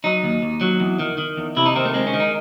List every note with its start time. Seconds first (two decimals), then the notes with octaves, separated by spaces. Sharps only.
0.04 F#3 D#4
0.23 D#2
0.42 D#2
0.61 F#3
0.80 E2
0.99 D#3
1.18 D#3
1.37 E2
1.56 C3 E4
1.66 D#4
1.76 D#3 C4
1.85 A3
1.94 G#3 C4
2.07 C#4
2.14 D#3
2.20 D#4